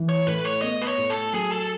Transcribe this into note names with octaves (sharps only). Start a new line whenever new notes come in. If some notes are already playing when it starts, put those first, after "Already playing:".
Already playing: E3
C#5
A2 B4
C#5
B3 D#5
B4
C#5
A2
A4
F#3 G#4
A4